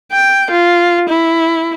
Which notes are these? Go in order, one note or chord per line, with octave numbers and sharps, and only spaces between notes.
G5
F4
E4